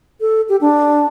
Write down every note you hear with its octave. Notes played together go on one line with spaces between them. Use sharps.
A4
G4
D4